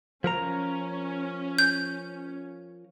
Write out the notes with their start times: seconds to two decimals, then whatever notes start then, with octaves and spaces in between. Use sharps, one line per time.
0.24 F3 C#4 A#4 A#5
1.59 G6